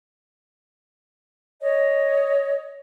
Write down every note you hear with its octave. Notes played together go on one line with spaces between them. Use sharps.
C#5 D#5